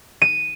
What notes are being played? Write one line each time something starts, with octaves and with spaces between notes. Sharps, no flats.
D#7